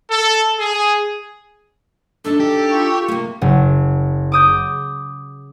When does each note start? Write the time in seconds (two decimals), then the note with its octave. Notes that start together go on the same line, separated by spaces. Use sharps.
0.11 A4
0.59 G#4
2.25 D4 D#4 A4
2.40 G4
2.71 F4 C#6
3.08 C3 A#3
3.42 F#1
4.32 D6 D#6 G6